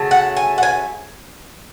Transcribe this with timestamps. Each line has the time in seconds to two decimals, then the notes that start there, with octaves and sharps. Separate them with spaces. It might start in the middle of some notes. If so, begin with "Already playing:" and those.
Already playing: C#3 F#3 A3
0.11 F#5
0.36 G#5
0.58 F#5
0.63 G#5